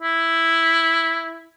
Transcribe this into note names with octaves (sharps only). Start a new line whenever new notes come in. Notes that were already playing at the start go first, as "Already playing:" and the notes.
E4